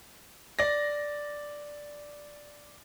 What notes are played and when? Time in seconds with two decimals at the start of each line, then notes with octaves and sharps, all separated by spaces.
0.59 D5 A#6